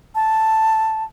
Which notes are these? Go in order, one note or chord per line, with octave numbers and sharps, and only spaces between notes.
A5